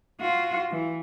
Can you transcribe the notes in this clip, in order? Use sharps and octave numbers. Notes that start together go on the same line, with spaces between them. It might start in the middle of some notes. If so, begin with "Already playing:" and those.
F4 F#4
E3